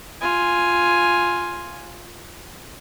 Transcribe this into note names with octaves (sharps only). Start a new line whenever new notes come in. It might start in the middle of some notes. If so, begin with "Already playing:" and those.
F4 G#5